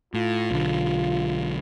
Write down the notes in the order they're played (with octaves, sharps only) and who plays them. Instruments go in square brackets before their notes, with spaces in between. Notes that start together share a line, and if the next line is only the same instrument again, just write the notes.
[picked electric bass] A2 [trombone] F4
[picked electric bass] B1 D3